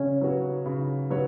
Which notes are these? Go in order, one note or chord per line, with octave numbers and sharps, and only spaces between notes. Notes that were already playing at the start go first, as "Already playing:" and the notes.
Already playing: C#3 C#4
F#3 B3 F#4 C#5
C#3
F#3 B3 F#4 C#5